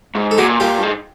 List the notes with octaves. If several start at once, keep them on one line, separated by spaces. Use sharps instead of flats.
G#2
A4
A#2 F#4 G#4
A#2 F4 G4
G2
G#2